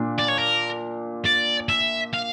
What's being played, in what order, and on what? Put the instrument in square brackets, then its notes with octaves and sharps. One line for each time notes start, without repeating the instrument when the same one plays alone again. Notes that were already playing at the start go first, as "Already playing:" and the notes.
Already playing: [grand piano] A#2 D4
[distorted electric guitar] D5
C#5
A#4
D5
E5
F5